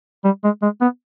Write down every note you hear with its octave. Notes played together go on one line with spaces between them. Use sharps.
G3
G#3
G#3
B3